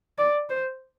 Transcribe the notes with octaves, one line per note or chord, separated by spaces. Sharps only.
D5
C5